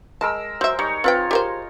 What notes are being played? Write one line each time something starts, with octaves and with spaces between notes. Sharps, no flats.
G#3 A#4 A5 E6
F#3 C5 E5
G3 D#4 C#5
C4 F4 B4 G5
G4 A#4 C5